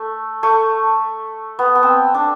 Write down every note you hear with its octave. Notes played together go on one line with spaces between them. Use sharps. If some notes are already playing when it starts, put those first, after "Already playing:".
Already playing: A3
A3
B3
B3
C4
D4